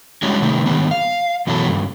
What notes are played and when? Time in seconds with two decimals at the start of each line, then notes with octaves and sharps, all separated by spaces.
0.23 G3 G#3 C#4 D4 E4 F#4
0.42 C3 D#3 G3 A3
0.66 D3 D#3 G3 B3
0.91 F5
1.47 F#2 B2 E3 F#3 B3 A4
1.67 G2 C#3